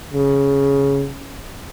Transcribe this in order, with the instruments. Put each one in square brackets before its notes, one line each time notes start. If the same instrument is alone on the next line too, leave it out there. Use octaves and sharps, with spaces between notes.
[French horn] C#3